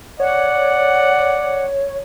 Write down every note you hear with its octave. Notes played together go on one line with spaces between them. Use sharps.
C#5 D5 F#5